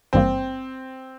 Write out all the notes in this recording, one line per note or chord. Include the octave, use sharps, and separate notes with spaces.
G#1 G2 E3 G3 A#3 C4